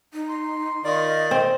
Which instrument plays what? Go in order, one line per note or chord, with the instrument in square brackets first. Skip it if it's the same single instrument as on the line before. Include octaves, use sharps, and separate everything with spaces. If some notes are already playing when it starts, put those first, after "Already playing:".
[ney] D#4
[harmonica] C6
[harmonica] D#3 F4 D5 [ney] D#5
[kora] C4